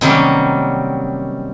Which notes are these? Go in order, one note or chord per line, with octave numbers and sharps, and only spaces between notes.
C3 D#3 F#3 G3 A#3 C#4